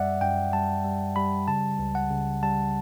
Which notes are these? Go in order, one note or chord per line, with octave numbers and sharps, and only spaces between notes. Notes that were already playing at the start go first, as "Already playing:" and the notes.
Already playing: F#2 G3 D5 E5 F#5
F#2 G5
G3 A5
G3
G3 B5
C#3 A5
C#2
F#5
C#3
G3 A5